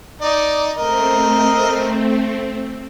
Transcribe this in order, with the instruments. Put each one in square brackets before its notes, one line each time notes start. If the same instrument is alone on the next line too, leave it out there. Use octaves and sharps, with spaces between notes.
[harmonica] D#4 D5
[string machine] A3 C4 [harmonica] A#4 D#5